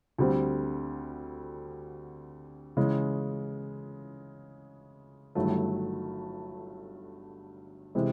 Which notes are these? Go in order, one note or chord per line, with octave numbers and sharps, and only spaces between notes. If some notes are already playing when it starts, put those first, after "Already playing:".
D2 D3 G3 C4
C#3 E3 G#3
G1 G2 D#3 F#3 A3
C3 E3 G#3